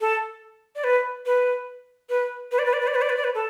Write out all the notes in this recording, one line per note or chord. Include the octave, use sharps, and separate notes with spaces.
A4
D5
B4
B4
B4
B4
D5
B4
D5
B4
D5
B4
D5
B4
D5
B4
A4